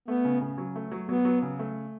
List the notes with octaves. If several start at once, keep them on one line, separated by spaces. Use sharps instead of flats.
A3 B3
C#3
C#3
F#3
A3
F#3
F#3 B3
F#3
C#3
A3